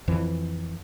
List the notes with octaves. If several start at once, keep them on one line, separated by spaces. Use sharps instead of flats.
F2 E3